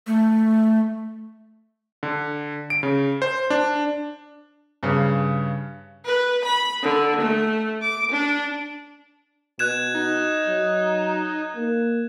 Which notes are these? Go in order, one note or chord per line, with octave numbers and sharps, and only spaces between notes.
A3
D3
D7
C#3
C5
D4
G2 C#3
B4
B5
D3
A3
D6
D4
B2 F#6 G#6 E7
D#4
F#3
A#3